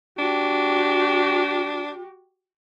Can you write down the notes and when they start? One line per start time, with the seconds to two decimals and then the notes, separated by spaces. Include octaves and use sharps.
0.19 D4 F#4 G4